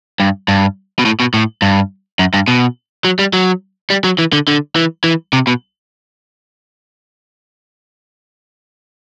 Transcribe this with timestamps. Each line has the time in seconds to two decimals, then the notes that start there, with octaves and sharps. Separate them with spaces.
0.20 G2
0.48 G2
0.99 B2
1.05 A2
1.20 B2
1.34 A2
1.62 G2
2.19 F#2
2.34 G2
2.48 B2
3.05 F#3
3.19 G3
3.33 F#3
3.90 G3
4.04 F#3
4.18 E3
4.33 D3
4.48 D3
4.76 E3
5.04 E3
5.33 C3
5.47 B2